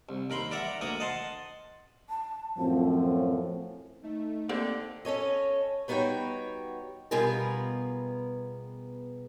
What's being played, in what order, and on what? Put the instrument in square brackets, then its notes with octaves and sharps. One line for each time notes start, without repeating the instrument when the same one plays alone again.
[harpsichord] C2
D#2 A#4 B5 C6
A#4 D5 E5 F#5 A#5
D2 A#3 A#4 F#5 D#6
D#5 F#5 A5 C6
[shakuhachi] A5
[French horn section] F#2 A2 F3 [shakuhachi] C4
[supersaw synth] A3 [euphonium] D#4
[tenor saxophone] D3 [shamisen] A#3 C4 G4
[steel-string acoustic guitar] C#4 A4 C#5 D#5
G3 B3 D#4 F#4 C#5 G5
B2 G3 B3 F4 G#4 A#4